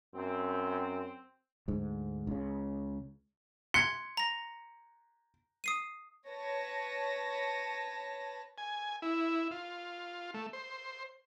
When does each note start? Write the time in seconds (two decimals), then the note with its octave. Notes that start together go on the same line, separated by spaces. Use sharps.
0.15 F#2 C4
1.68 D2 G#2
2.27 C#2 C#3
3.74 C6 F#6 G#6 C#7
4.17 A#5 A#6
5.64 D#6 C7 D#7
6.28 B4 C#5 A5 A#6
8.58 G#5
9.02 E4
9.51 F4
10.34 A3
10.53 C5